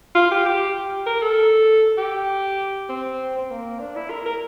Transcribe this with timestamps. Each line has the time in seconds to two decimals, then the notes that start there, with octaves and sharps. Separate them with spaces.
0.15 F4
0.31 G4
0.46 G4
1.06 A#4
1.22 A4
1.98 G4
2.89 C4
3.38 C4
3.50 A#3
3.80 D4
3.95 E4
4.10 A#4
4.26 A#4